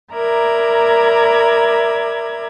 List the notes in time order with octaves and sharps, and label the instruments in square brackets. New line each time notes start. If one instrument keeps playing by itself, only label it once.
[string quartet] A#4 D5 E5 A#5 B5 G#6